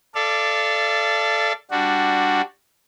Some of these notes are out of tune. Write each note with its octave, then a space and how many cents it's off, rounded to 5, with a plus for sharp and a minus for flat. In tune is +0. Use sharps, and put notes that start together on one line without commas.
A4 -5 D5 +0 F5 -40
G3 +10 D4 +0 F#4 +0